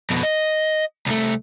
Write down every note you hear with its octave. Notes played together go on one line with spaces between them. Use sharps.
F2 B2
D#5
C2 A3